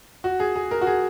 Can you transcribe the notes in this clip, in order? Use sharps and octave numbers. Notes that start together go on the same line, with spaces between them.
F#4
G#4
G#4
A#4
F#4
G#4